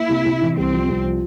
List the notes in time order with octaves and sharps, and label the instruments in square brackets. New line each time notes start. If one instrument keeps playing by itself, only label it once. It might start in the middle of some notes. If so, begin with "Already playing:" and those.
Already playing: [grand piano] A#3 [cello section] E4
[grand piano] C3
C3
E3
[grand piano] C2 [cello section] C4
[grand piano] F3
C2
F3